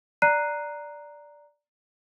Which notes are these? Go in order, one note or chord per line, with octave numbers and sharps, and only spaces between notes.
D5 A#5 F#6 C7 D#7